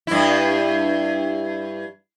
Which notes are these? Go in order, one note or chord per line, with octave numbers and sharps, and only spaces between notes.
G2 E4